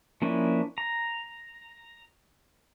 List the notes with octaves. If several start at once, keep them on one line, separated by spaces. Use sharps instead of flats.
F3 A#3 C#4 D4 E4
A#5